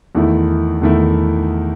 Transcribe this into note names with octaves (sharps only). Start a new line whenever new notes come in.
E2 D#3 A3 E4
E2 D#3 A3 E4